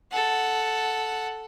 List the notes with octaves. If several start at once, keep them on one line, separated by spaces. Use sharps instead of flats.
A4 F#5